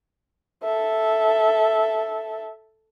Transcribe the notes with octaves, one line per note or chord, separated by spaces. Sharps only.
A4 E5